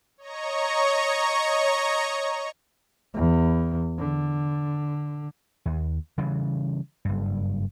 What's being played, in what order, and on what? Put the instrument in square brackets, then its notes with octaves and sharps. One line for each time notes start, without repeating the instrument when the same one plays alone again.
[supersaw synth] C#5 D#5 A#5 C#6
[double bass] E2
D3
[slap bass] D#2
C#3 E3 G3
F#1 G2